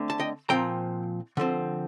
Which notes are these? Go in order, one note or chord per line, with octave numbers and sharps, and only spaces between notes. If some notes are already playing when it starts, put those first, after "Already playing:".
Already playing: D3 A3 C4
A5
D#5 G5
A#2 F3 C4 G5 A#5
D3 F3 C4